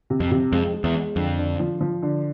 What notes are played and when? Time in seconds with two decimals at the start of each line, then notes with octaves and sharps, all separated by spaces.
0.10 C3
0.20 F2
0.31 C3
0.52 F2 G#3
0.74 G#3
0.84 E2
0.96 G#3
1.16 F2 D3
1.38 D3
1.60 F3
1.81 F3
2.02 D3